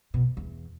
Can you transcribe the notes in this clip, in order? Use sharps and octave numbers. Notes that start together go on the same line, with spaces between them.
B2
E2